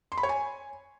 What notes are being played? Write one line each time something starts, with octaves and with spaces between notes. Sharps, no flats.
C6
B5
C#5
G#5